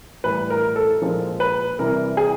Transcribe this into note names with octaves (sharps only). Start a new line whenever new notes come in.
A2 E3 G3 B4
A#4
A4
A#2 F3 G#3 A#4
B4
C3 E3 G3 A#4
G#4